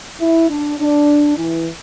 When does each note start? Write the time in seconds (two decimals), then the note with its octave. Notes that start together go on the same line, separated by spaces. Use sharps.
0.21 E4
0.50 D4
0.79 D4
1.37 E3